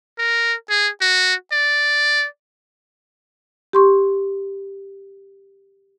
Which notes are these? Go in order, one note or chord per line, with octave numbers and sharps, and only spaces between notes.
A#4
G#4
F#4
D5
G4 C6 C#6